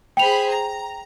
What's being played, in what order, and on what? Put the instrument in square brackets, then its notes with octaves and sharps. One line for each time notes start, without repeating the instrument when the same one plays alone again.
[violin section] G#4 C5 B5 [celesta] G5 F7
[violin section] A#5